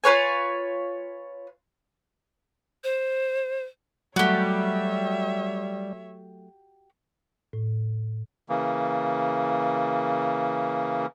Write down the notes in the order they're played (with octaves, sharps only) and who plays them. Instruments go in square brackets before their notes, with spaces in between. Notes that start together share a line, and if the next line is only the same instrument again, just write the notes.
[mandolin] F4 B4 C#5 G#5
[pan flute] C5
[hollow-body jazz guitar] F#3 A3 [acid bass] G3 [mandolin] F#4 G4 [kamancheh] C#5 E5
[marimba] A2
[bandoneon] C#3 E3 A#3